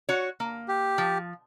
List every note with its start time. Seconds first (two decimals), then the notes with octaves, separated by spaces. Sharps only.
0.09 F#4 C#5
0.40 A#3
0.68 G4
0.98 F3